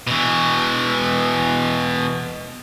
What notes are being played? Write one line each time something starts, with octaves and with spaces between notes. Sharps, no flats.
B2 E3